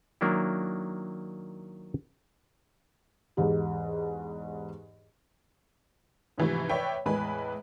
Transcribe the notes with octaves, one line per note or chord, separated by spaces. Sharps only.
D#3 F#3 A#3 D4 E4
E2 G#2 G4
G#2 C3 E3 F3 A3
B4 C#5 D5 E5 G5 B5
E2 A2 G#3 B4 G#5 B5